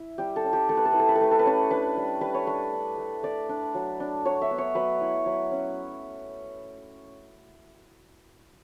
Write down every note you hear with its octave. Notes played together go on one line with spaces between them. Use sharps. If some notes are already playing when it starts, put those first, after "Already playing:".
Already playing: E4
G3 G4
A4
C#4
G4
A3 A4
B4
A4
E4 B4
A4
B4
A4
A3 B4
A4
B4
C#4 A4
D4 B4
G3
G3 B4
C#5
D4 B4
D4
A3
A3 D5
D4
F#3
D4
F#3 C#5
E5
B3
C#5
F#3 B4
E4
F#3
C#4